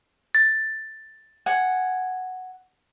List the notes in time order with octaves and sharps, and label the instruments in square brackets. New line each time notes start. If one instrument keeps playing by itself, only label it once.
[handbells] A6
[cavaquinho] F#5 G#5